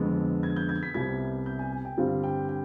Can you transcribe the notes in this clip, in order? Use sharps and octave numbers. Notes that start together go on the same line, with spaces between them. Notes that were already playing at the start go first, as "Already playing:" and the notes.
Already playing: F2 D3 G#3 B3
G#6
G6
G#6
B6
C2 C3 G3 B3 G#6
G6
G#5
G#5
G5
G2 D3 G3 C4 F5
G5
G5